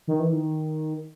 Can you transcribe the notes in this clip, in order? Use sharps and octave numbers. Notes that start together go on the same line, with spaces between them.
D#3
E3
D#3